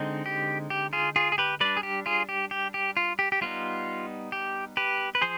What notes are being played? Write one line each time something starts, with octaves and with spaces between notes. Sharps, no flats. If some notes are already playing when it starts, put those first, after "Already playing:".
Already playing: D3 G#3 C4 D#4
G4
G4
F4 G#4
F4 G#4
G#4
G4 B4
G3 D4 B4 D5
G#4
G4
F4 G#4
G4
G4
G4
F4
G4
G4
G3 B3 D#4 F4
G4
G4 B4
B4
F3 G#4 C5